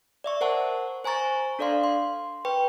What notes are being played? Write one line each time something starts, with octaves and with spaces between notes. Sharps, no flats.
D5 E5 C#6
A#4 C5 F#5 A5 C#6
C5 G#5 A#5 C#6 A6
D4 A4 D5 F5 C6
C6
B4 G5 C#6